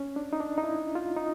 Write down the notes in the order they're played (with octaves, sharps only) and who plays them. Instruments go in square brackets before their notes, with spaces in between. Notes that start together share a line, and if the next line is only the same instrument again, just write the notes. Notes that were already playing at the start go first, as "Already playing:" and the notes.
Already playing: [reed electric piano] C#4
D4
D#4
D4
D#4
E4
F4
D#4